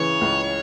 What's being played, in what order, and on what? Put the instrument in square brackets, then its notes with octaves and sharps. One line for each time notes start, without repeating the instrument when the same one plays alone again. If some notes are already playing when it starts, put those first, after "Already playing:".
Already playing: [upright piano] C#3 E3 [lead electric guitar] C#5
[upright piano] C#2